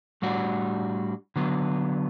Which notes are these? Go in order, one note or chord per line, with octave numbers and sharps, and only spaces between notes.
A2 G3 D4 F#4
D3 F#3 B3